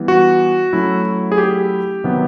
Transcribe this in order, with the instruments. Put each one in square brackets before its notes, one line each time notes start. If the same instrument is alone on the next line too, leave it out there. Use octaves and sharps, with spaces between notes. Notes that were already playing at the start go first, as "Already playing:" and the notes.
Already playing: [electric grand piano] E3 G3 B3
F#4
F#3 A3 C#4 E4
G#4
G4
C3 D#3 F#3 B3